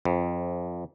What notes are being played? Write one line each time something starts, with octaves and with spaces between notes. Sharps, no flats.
F2